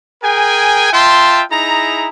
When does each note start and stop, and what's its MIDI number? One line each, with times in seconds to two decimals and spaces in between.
0.23 0.89 68
0.23 0.89 70
0.23 0.89 79
0.23 0.89 80
0.93 1.42 65
0.93 1.42 76
0.93 1.42 79
0.93 1.42 81
0.93 1.42 84
1.51 2.09 63
1.51 2.09 64
1.51 2.09 68
1.51 2.09 82